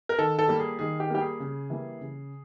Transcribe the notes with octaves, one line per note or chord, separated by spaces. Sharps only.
A#4
D#3 A4
A4
G3 A#3
G#4
D#3 G#4
G4
G3 A#3 G4
G#4
C#3
E3 G3 A#3
C#3